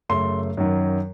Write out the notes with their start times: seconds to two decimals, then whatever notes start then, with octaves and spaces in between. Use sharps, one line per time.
0.09 F#2 C#3 A3 C6
0.57 F#2 D#3 F#3